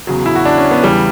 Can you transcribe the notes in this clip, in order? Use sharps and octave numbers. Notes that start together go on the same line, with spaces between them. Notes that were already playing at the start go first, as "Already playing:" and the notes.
E2 C#3 F#3
E4
F#4
D4
C#4
B3
E2 C#3 E3 G3